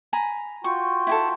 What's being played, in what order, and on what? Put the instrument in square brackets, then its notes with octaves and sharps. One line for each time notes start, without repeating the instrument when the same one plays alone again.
[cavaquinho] G#5 A#5 B5
[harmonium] F4 F#4 G5 [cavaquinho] C#6
[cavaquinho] E4 G4 A4